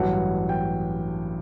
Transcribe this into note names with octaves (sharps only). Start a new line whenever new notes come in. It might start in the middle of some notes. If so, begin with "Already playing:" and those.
Already playing: A1 G2 F#3 F#5
G5